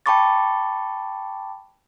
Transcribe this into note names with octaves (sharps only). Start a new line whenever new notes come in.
G5 A5 B5 C#6 D6 A6